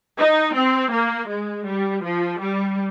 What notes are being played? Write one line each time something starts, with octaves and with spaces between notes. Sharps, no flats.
D#4
C4
A#3
G#3
G3
F3
G3